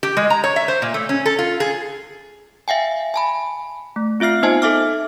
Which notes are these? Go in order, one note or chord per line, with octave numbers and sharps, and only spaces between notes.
G4
G#3
A#5
C#5
E5
C5
A#2
A3
C#4
A4
F4
G#4
E5 F5 G5 G#5
G#5 A5 B5
A3
C4 F4 E5 F6 C7
B3 D#4 C5 D#5 G#5 A5
A4 E5 D6 F6